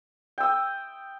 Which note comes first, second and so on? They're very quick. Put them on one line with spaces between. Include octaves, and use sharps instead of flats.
G5 E6 D#6